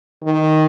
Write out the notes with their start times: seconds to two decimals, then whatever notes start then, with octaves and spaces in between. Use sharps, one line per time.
0.23 D#3